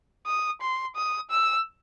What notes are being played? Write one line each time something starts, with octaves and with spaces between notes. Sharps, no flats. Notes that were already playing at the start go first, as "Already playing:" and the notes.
D#6
C6
D#6
E6